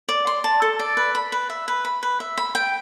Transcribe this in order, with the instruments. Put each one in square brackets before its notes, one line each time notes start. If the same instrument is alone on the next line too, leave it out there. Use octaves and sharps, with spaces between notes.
[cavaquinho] D5
C6
A5
A4
D5
B4
B5
B4
E5
B4
B5
B4
E5
B5
G5